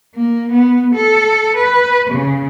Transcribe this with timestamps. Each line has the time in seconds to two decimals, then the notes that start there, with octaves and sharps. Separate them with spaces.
0.15 A#3
0.52 B3
0.95 A4
1.57 B4
2.10 C#3